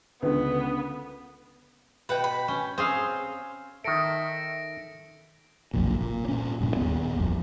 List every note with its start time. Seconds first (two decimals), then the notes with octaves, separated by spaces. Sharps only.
0.22 C#2 D3 B3 B4
2.09 B2 B4 F#5 G5
2.24 B5
2.48 C#4 G5
2.78 C4 C#4 G#4 F5
3.84 D#3 A4 E5 A#6 C#7 D7
5.74 F#1 B1 F2 A#2
6.01 A#2
6.29 A#2 C#4
6.61 G2 A#2
6.77 D#2 B3
7.19 D#1 A1 F2